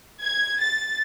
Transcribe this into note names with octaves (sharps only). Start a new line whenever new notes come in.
G#6
A6